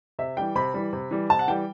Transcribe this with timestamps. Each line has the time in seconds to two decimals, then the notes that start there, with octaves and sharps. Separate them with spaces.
0.19 C3 E5
0.37 E3 G3 G5
0.55 C3 B5
0.74 E3 G3
0.93 C3
1.11 E3 G3
1.29 C3 A5
1.39 F#5
1.48 E3 G3 G5